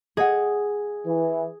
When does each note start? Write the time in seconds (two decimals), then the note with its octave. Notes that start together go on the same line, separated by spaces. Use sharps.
0.17 G#4 D#5 F#5
1.06 E3